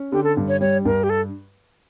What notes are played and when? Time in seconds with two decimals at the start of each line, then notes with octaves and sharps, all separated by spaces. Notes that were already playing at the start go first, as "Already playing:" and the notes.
Already playing: C#4
0.12 D3 G4
0.24 A4
0.37 G2
0.48 C#5
0.61 G3 C#5
0.85 G2 A#4
1.04 G4
1.10 A4